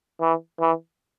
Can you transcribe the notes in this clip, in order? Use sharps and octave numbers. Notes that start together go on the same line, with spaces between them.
E3
E3